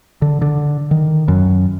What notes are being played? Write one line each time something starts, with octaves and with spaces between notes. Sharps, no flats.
D3
D3
D#3
F#2